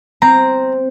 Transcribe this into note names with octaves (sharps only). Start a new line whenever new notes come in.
C4 A#5